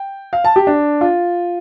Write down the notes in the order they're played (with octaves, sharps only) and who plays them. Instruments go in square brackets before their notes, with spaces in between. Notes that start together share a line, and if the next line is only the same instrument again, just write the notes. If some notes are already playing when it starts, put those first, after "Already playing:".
Already playing: [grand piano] G5
F5
A5
G4
D4
F4